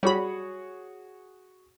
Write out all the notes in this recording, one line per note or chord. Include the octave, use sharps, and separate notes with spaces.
G3 F#4 G#4 C#5 B5